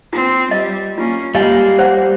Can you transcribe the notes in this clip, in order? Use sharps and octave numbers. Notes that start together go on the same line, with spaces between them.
C4 F4
G3 D#5
A#3 C#4 F4
G3 G#3 A#3 D#5 F5 G#5
C5 F#5